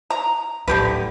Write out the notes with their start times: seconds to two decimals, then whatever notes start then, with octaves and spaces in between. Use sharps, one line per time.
0.10 A#5
0.68 D1 D3 E4 G4 B4